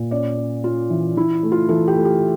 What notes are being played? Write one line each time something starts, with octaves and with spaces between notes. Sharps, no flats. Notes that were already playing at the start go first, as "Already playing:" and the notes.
Already playing: A#2
C#4 D5
C#4
C#4 F4
E3
E3 E4
A3
F4
E3 A4
G4
A3
G4